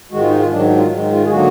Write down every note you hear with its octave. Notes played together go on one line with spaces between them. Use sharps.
G#2 D#3 G#3 F#4
F4
D#4
F4
G#2 D#3 F#3 D4
F4
G#2 D#3 G#3
F4
G#4
D3 F#3 A#3 F#4